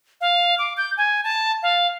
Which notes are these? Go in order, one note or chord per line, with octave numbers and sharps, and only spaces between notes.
F5
D6
G6
G#5
A5
F5